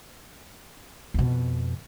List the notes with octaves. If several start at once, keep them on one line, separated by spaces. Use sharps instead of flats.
F2 B2